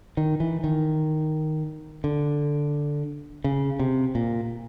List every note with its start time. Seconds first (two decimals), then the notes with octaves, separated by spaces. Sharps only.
0.17 D#3
0.40 E3
0.64 D#3
2.04 D3
3.44 C#3
3.79 C3
4.15 A#2